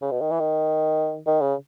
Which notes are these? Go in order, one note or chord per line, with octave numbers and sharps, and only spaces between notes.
C#3
B2
D#3
E3
D#3
D#3
C#3